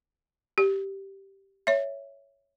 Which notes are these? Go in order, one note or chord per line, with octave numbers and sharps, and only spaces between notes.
G4
C#5 E5